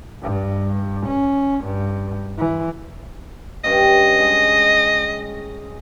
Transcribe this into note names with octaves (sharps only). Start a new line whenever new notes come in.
G2
C#4
G2
E3
G2 C#4 D#5 G5
G#3 G#4